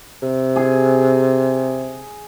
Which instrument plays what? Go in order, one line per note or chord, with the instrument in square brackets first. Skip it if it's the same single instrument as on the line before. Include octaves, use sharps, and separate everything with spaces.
[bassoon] C3
[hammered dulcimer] G#4